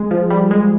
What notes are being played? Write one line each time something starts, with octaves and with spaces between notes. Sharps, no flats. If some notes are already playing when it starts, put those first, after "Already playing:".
Already playing: G#3
F3
G3
G#3